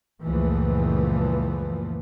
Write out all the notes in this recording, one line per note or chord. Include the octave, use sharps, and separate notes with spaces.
C#2 F#2 A#2 E3 F3 A3